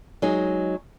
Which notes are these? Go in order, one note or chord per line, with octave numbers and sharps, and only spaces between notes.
F#3 G#3 D#4 G#4